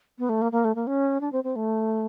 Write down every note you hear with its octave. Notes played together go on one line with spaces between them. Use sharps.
B3
A3
A#3
A#3
A3
A#3
C#4
D4
C4
C4
A3